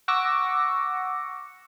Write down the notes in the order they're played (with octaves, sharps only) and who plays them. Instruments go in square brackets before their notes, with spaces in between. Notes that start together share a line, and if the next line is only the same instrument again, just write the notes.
[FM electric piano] F#5 C#6 D6 E6 A#6 C#7